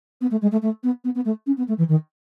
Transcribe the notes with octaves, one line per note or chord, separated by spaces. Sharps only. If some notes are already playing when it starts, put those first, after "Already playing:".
B3
A3
G#3
A3
A3
B3
B3
B3
A3
C#4
B3
A3
E3
D#3